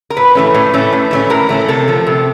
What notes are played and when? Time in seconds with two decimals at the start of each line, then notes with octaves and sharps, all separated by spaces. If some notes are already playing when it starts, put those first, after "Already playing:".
0.10 A#4
0.17 A2 B4
0.35 E3 A3 C#4
0.54 A2
0.73 E3 A3 C#4
0.93 A2
1.11 E3 A3 C#4
1.30 A2 A#4
1.49 E3 A3 C#4
1.68 C3 A4
1.88 F3 A3
2.07 C3